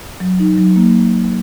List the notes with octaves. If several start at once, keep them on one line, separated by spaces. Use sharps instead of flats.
F#3
D#4
F#3
A#3